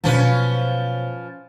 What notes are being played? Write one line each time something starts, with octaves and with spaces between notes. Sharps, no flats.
B2 F3 F#3 C#4 B4